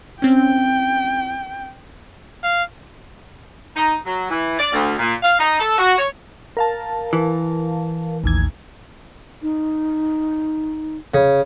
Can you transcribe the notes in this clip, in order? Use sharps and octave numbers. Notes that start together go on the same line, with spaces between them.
C4 C#4 G5
F5
D#4
F#3
E3
D5
D2
A#2
F5
D#4
A4
F#4
C#5
A#4 F5 A5
E3
A1 D#2 G#6
D#4
C#3